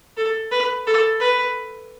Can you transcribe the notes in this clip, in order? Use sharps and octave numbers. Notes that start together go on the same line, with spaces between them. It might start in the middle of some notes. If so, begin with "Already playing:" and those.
A4
B4
A4
B4